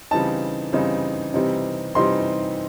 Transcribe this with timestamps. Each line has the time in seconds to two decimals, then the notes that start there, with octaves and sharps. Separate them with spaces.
0.11 C#3 E3 G3 C4 D#4 A5
0.73 C#3 E3 G3 C4 D#4
1.34 C3 E3 G3 C4 D#4
1.95 C3 E3 G3 C4 D#4 C6